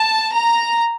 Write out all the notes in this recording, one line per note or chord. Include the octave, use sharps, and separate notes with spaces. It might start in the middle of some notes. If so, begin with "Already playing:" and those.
Already playing: A5
A#5